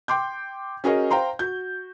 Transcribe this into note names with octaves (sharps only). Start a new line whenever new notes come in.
G5 C6 D6 G6
C#4 F#4 G#4 A#4 C#5 D#5
C5 F5 G5 A#5 C6
F#4 G6